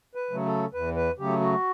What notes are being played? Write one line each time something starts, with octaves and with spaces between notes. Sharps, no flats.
B4
C#3 F#3 A3
A4
E2 B4
B4
C#3 F#3 A3 G4
F#4